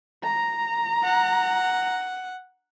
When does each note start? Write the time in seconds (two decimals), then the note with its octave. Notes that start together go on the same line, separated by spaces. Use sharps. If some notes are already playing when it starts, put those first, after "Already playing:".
0.24 A#5
1.04 F#5